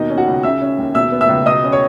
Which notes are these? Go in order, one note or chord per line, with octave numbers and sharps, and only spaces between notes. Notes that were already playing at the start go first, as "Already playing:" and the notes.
Already playing: D#2 B2 D#4 D#5
C#4
F#4 F#5
C#2
C#3 E5 E6
C#4
D#2
B2 E5 E6
B3
E5 E6
C#2
B2 D#5 D#6
C#4
C#5 C#6